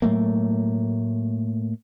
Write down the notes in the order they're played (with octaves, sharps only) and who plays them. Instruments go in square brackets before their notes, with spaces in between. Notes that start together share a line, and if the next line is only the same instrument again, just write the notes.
[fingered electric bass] A2 F#3 A3 A#3